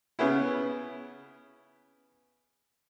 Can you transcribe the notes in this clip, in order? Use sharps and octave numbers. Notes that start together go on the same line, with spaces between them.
C#3 B3 C#4 E4